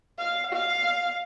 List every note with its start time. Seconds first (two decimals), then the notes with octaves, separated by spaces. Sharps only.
0.18 F5
0.53 F5